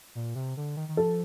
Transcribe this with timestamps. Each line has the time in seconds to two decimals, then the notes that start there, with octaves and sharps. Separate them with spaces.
0.15 A#2
0.35 C3
0.57 D3
0.77 D#3
0.89 D#3
0.97 F3 A4